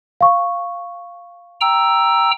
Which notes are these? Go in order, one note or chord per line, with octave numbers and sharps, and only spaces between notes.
F5 C#6
G5 A#5 E6